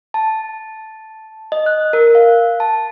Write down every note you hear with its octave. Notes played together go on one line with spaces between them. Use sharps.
A5
D#5
F#6
A#4
F5
A5